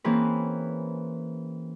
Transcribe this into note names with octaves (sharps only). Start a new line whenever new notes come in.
E3 A#3 C4 C#4 G#4 B4